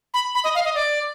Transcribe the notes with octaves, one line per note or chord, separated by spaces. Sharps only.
B5
B5
D#5
F5
D#5
D5